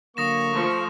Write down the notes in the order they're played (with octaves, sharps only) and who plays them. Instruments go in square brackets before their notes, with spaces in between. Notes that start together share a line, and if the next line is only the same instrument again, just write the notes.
[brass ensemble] D3 F#3 A#3 [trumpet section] C#6 [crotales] D#6 A#6 E7
[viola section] F3 A3